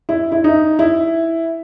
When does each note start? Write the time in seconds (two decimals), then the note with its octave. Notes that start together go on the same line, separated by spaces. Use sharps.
0.09 E4
0.32 E4
0.44 D#4
0.79 E4